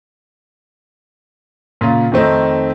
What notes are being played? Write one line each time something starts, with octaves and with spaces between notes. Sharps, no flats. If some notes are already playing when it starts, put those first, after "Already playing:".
A#2 C#3 F4
F2 D#3 A3 C4 D#4